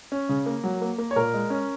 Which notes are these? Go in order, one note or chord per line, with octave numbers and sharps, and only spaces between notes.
C#4
C#3
A#3
F#3
A#3
A#3
C#5
A#2 A#4
G#3
C#4